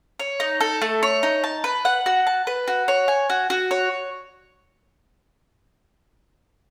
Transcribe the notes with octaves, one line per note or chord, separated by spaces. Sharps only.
C#5
D#4
A4
A3
C#5
D#4
A5
B4
F#5
F#4
A5
B4
F#4
C#5
G#5
F#4
F#4
C#5